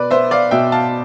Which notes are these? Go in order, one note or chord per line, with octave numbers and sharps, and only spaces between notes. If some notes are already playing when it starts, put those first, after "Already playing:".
Already playing: B2 B4 D5
B3 C5 E5
D5 F5
B2 E5 G5
F5 A5